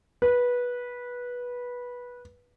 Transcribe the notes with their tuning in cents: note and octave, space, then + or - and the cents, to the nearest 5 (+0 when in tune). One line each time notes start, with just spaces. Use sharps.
B4 -15